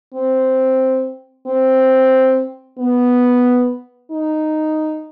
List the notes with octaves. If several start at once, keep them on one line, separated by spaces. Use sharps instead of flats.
C4
C4
B3
D#4